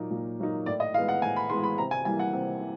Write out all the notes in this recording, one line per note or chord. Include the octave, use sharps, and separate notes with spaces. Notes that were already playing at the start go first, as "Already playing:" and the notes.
Already playing: A#2 F#3 A#3 D#4
A#2
F#3 A#3 D#4
A2 D5
D#5
E3 G#3 B3 F5
F#5
A2 G#5
B5
E3 G#3 B3 C6
B5
C3 A#5
G#5
E3 G3 A#3 G#5
F#5
C3
E3